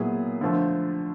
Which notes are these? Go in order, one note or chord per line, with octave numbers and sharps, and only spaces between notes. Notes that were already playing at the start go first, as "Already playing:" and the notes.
Already playing: A#2 F#3 B3 E4 G#4
D3 F3 A3